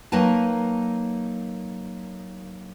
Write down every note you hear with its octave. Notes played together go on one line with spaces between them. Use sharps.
F#3 A#3 D#4 B4 G5 A5